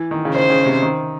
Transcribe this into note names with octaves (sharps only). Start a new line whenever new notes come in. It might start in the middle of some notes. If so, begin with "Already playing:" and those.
Already playing: E3
D#3
C#3
D#3 C5
C#3
C3
D#3